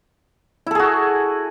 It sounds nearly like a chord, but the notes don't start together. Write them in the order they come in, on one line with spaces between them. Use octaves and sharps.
E4 A4 G#4 F#4